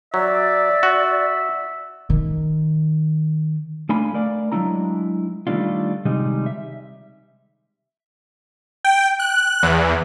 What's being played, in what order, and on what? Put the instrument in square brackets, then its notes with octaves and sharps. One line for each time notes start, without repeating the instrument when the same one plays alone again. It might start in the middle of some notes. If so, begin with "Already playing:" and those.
[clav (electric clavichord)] F#3 [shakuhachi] D5 [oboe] E5
[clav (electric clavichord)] F#4
[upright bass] D#3
[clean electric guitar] A3 D4 F5 G#5 B5
A3 A#4 D5 F5
F#3 G#3 D4 E4 A#5
D#3 G3 A3 D4 F4
C3 D#3 G3 G#3 D#4
E5
[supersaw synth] G5
F#6
E2